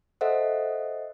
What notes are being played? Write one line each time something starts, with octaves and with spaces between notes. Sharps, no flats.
A4 C5 D#5 E5 F#5